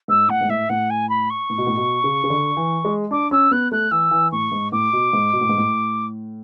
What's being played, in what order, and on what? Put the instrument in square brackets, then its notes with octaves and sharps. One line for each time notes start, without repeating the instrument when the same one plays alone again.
[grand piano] G#2 [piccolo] E6
[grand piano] A2 [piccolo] F#5
[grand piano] G#2
[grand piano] A2 [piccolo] E5
[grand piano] A2 [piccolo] F#5
[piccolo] G#5
B5
C#6
[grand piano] A2
B2
A2
B2
C#3
C#3
D3
E3
G#3
[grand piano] D4 [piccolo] D6
[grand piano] C#4 [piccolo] E6
[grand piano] B3 [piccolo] F#6
[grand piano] A3 [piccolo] F#6
[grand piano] E3 [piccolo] E6
[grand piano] E3
[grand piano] A2 [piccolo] C#6
[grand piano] G#2
[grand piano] A2 [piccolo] D6
[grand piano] B2
G#2
B2
A2
G#2
A2